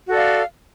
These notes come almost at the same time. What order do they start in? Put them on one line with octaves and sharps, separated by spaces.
F#4 A4 D5 F5